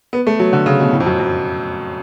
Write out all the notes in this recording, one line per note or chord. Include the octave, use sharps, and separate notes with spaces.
B3
A3
F#3
D3
C#3
B2
A2
F2
F#2
F#2